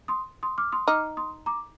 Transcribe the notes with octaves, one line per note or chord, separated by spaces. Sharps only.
C6 D#6
C6 D#6
D6 F6
C6 D#6
D#4 D6 F6
C6 D#6
A#5 D6